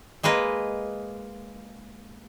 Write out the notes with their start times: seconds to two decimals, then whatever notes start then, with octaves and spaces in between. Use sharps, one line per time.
0.23 G#3 A#3 G#4 B4 D#5